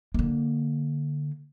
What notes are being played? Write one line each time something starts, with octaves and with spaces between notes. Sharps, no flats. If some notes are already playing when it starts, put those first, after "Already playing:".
D3 A#3